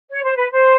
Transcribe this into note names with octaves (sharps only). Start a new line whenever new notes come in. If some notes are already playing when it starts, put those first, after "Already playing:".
C#5
C5
B4
C5